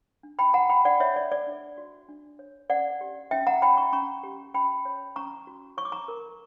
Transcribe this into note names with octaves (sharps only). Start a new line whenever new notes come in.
D4
G5 B5
F#4 F#5 A#5
G5 B5
D4 D5 F#5
C#5 E5
C#5 D5
D5
D4
F#4
D4
C#5
C#4 D5 F#5
G4
C#4 E5 G5
F#5 A#5
C#5 G5 B5
A#5 C#6
C#4 A#5 C#6
G4
C#4 G5 B5
C#5
C#4 A#5 C#6
F#4
C#5 C#6
D6
A#5 C#6
A#4